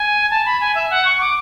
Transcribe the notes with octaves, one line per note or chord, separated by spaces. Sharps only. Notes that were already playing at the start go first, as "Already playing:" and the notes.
Already playing: G#5
A5
B5
G#5
E5
F#5
C#6
D6